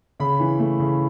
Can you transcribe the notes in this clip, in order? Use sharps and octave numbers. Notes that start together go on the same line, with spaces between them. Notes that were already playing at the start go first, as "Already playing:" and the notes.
C#3 B5
E3
A3
C#3